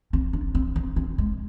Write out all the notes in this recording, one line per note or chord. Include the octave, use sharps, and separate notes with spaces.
C4
D4
C4
C4
C4
G#3